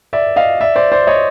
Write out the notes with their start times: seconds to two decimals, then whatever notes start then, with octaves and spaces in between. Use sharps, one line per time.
0.13 D5 E5
0.36 D#5 F5
0.61 D5 E5
0.75 C5 D5
0.92 C5 D5
1.07 C#5 D#5